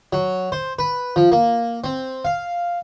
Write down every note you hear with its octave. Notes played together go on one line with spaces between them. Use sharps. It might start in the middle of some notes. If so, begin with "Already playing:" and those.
F#3
C5
B4
F3
A#3
C4
F5